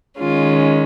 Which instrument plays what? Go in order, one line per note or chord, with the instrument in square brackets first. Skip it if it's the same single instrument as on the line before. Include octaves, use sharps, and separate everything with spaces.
[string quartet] D#3 G#3 C#4 F4